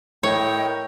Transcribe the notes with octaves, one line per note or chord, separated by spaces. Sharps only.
A2 A#4 C#5 D#5 G5